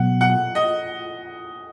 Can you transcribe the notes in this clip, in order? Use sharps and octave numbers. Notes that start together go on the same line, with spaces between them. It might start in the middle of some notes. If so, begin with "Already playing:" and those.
Already playing: B2 F#3 B3 F#5
F#5
D#5